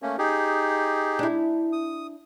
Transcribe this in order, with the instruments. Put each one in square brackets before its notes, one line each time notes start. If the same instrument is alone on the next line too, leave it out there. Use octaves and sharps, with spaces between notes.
[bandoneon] A3 A#3 C#4
D#4 G4 G#4
[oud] D4 E4
[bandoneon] D#6